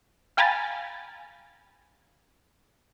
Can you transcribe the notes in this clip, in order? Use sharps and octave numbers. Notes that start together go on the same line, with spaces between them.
F5 G5 G#5 A#5 B5 A6